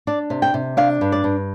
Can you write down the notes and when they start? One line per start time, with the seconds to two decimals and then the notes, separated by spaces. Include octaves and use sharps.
0.07 D4 D5
0.30 C3
0.42 G5
0.54 C3
0.77 D4 F5
1.01 G2
1.12 D5
1.24 G2